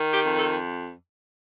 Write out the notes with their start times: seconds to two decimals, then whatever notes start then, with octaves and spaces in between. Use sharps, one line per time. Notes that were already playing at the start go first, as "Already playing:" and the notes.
Already playing: D#3
0.13 G4
0.24 F2
0.37 A4